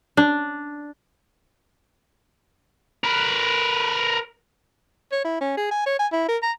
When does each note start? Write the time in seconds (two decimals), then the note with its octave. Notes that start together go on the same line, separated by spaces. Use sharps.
0.17 D4
3.04 A#4 B4
5.12 C#5
5.24 E4
5.41 C#4
5.57 G#4
5.71 G#5
5.86 C#5
5.99 G#5
6.12 E4
6.28 A#4
6.42 A#5